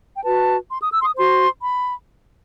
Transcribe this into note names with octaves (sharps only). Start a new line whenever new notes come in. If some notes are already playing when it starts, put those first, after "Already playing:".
G5
F#4 B4 A5
C6
D#6
E6
C6
D#6
F#4 C5 C6
B5